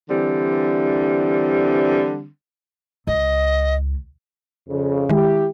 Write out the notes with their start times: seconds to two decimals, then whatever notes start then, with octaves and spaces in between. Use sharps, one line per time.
0.10 D3 E3 G3 C4
3.07 C#2 D#5
4.69 F2 C#3
5.09 D#3 G#3 E4 G4